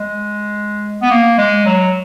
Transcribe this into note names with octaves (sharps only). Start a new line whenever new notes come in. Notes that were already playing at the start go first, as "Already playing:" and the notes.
Already playing: G#3
B3
A#3
G#3
F#3